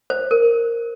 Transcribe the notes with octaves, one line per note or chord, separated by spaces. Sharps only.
C5
A#4